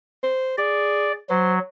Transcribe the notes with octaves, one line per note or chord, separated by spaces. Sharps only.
C5
G#4 D5
F#3 C5